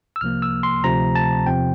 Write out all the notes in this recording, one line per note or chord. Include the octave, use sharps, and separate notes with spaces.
E6
C2 C3 F3 A#3 F6
E6
C6
D2 C3 F3 A3 A#5
A5
E2 C3 F3 C4 G5